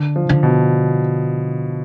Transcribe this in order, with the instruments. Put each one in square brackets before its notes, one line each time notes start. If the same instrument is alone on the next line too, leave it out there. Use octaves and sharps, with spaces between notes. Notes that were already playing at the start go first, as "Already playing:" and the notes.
Already playing: [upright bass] D3
[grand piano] F3
[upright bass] D3
[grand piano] B2